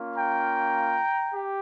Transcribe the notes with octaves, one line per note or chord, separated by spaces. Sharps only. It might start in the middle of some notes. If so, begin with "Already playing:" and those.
Already playing: A#3 C#4 F4
G5 A#5
G4